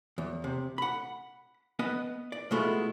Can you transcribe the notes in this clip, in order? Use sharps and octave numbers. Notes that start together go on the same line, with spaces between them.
E2
C3
F#5 B5
B3 B4 D#5
D5
B2 G#3 A3 B3 E4 F4